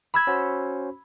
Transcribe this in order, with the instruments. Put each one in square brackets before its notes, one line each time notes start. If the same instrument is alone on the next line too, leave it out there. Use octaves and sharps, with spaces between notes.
[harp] B5 E6 G#6
[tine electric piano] C#4 F#4 C5